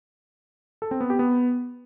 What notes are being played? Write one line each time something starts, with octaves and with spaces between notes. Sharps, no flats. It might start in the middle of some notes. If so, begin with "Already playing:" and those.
A4
C4
B3
G4
B3